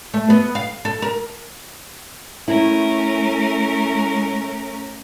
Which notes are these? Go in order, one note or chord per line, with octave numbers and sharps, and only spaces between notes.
A3
B3
F5
A4
A#4
A3 C#4 E4 A#4